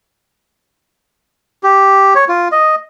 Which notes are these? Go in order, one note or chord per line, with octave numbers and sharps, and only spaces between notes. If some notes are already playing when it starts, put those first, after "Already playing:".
G4
C#5
F4
D#5